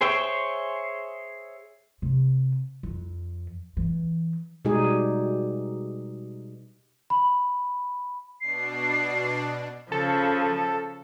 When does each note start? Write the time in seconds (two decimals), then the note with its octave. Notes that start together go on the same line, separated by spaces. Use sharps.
0.01 G#4 C5 C#5 E5 G5
2.02 C3
2.83 F2
3.77 E3
4.65 B2 G3 G#3 D#4 G4 G#4
7.10 B5
8.41 B2 D4 C7
9.92 C#3 F3 A4